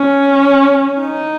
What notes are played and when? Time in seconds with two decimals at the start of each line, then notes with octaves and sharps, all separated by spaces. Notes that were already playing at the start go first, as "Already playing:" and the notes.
Already playing: C#4
1.01 D#4